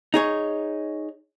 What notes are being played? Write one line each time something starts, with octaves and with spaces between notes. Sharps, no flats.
D#4 G#4 C#5